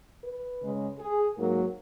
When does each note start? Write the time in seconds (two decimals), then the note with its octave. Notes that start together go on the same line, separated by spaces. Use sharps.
0.25 B4
0.62 C#3 G#3 C#4
0.99 G#4
1.37 G#2 F#3 A#3 A#4